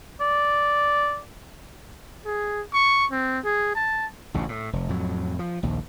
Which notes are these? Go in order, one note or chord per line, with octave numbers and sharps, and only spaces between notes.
D5
G#4
C#6
C4
G#4
A5
A1 D2 C#3
A2
F1
F2 A2 F#3
F3
A#1 D#2